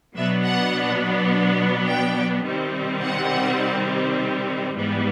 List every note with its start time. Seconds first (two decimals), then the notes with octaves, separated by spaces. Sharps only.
0.16 B2 F#3 B3 D4 E5
0.45 F#5
1.88 G5
2.45 C3 D#3 G3 C4
3.03 F#5
4.75 G#2 E3 G3 B3